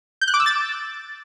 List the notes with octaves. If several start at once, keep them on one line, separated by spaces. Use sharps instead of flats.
G6
F#6
D6
E6
A6